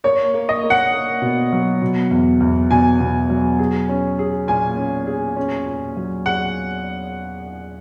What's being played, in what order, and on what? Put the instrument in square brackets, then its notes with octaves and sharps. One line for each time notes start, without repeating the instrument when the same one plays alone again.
[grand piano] A#3 [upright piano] C#5
[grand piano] A#3
[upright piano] D#5
[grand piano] A#3
[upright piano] F#5
[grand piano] A#3
B2
F#3
B2
E2
E2
[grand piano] B2 [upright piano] G#5
[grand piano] B2
F#3
G#4
C#4
G#4
[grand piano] A#2 [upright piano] G#5
[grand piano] C#4
G#4
C#4
A#2
F#3
[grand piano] G#4 [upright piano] F#5